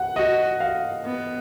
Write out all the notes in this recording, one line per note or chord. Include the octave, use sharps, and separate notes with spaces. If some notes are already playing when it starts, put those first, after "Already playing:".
Already playing: F#5
F#4 D#5
F5
B3